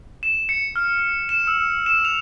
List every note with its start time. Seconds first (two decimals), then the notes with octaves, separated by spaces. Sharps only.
0.23 E7
0.49 C#7
0.76 F6
1.29 E7
1.47 E6
1.86 E7
2.05 F7